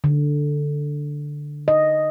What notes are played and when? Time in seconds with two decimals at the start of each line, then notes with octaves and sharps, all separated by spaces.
0.04 D3
1.68 D#5